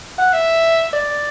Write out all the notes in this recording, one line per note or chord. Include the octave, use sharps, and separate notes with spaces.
F#5
E5
D5